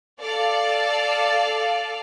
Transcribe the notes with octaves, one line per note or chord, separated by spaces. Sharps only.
A4 D5 F5